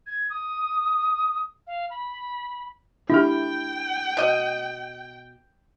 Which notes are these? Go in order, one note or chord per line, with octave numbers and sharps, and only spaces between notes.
G#6
D#6
F5
B5
D4 E4 G4 G5
B2 D#5